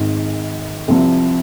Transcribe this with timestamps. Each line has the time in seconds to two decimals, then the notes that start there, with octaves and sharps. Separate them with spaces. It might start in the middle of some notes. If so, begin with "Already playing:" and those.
Already playing: G#1 G#2 D#3 G#3
0.88 C2 C3 F3